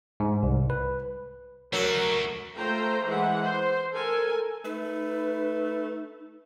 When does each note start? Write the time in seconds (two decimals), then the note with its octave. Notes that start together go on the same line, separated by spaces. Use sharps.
0.20 G#2
0.43 C2
0.70 B4
1.73 F#3 A3 F#4 A#4
2.55 A3 F4 C5 G5 A#5
3.08 E3 G#3 F#5
3.44 C5
3.93 A4 A#4 G#5
4.65 A3 D#4 B4